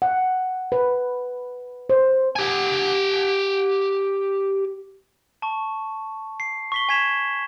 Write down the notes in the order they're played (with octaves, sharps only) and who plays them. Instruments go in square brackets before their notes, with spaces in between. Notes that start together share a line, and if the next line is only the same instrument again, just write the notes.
[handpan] F#5
B4
C5
[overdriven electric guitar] G4 G#5
[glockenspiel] A5 C#6
C7
C#6 B6 G7
G#5 C#6 G#6 B6 E7 F7